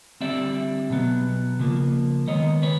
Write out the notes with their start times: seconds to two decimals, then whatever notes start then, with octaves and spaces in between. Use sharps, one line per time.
0.21 D3 G3 C4 D5 E5
0.90 B2 F#3 B3
1.59 C#3 F3 A#3
2.27 D#3 G#3 B3 C#5 D#5
2.62 B4 C#5